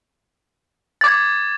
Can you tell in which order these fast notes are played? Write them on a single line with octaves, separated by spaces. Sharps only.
A6 D6 G#6